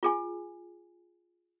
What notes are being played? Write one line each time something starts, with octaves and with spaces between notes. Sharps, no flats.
F4 G#4 G#5